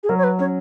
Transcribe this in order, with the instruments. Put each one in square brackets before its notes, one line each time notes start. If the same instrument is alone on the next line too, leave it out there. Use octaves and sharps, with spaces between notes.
[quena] G#4
[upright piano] F#3 [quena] A#4
[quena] C#5
B4
[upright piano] C#4 [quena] C#5